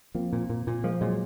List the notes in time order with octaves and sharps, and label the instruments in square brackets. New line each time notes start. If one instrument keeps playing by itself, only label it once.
[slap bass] F3 [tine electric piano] A#3 C4
[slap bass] A#2
A#2
A#2
[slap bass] F3 [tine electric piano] G#3 A#3
[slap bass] A#2 [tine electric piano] F#3 G#3